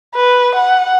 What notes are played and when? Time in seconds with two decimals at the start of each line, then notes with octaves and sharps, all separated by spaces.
0.15 B4
0.55 F#5